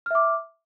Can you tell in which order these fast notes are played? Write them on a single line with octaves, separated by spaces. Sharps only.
F6 E5 D6